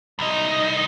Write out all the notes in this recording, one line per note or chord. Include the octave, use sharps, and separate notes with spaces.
C2 D#4